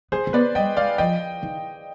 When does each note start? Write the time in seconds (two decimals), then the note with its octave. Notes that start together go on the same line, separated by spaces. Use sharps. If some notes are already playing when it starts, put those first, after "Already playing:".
0.12 B3 G#4 C5
0.27 C4
0.33 B3 B4 D5
0.55 G3 D#5 G5
0.77 G#3 D5 F5
0.98 F3 D#5 G5
1.43 D#3